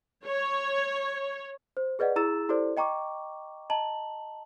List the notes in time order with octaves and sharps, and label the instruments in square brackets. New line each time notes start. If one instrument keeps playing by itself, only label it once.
[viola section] C#5
[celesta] C5
G#4 B4 D5 D#5 F#5
E4 G#4 A#5 E6 A6 E7
E4 G4 A4 C5 D5
D#5 G5 A#5 C#6 D6
D#5 A5 A#5 F#7